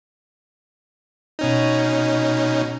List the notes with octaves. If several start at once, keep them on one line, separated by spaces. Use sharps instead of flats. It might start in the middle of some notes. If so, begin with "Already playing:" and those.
B2 C#4 D#4